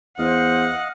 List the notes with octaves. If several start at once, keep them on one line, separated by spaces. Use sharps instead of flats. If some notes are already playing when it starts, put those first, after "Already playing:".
E2 C5 D#5 F5 F#5